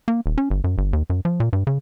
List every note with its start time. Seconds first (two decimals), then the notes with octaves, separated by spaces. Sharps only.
0.08 A#3
0.26 D#1
0.38 C#4
0.50 G1
0.64 F#2
0.78 G1
0.93 D#2
1.10 F#2
1.25 F3
1.40 A#2
1.53 G2
1.67 C#3